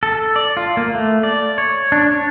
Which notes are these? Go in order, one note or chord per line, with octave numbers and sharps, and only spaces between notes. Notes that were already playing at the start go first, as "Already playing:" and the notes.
A4
D5
F4
A#3
A3
D5
C#5
D4
C#5